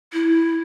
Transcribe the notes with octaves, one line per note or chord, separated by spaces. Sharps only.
E4